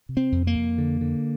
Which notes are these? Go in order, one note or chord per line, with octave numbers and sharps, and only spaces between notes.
C3
C4
F2
A#3
F2
D3
D3